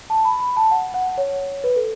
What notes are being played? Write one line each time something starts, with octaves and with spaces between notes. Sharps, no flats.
A5
B5
B5
A5
F#5
F#5
C#5
B4
A4